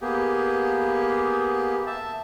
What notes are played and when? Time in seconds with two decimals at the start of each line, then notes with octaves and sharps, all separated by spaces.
0.01 A#3 B3 G4 G#4
1.87 E5 A5